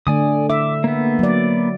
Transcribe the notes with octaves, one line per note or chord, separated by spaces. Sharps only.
D3 A3 D5 G#5 D#6
E5 D6
A#3 B3
F#3 D5